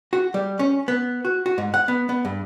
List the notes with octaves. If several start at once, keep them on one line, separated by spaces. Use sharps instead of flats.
F#4
G3
C#4
B3
F#4
F#4
G#2
F#5
B3
B3
G2